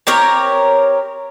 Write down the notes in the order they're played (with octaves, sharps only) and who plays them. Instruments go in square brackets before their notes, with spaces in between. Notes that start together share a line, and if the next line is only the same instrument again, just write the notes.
[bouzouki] C4 G4 A#4 C#5